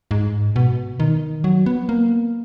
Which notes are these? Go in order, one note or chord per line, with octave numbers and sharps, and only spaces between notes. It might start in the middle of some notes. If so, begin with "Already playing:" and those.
G#2
B2
D#3
F#3
B3
A#3